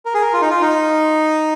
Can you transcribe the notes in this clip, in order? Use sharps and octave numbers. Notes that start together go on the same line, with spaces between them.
A#4
G#4
A#4
F4
D#4
F4
D#4